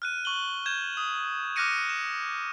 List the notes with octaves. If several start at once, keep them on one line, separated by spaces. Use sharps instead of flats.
F6 F#6 D#7
C#6 F#7 G7
G6 G#6 E7
D#6
D6 F6 F#6 A#6 C#7 D#7
E7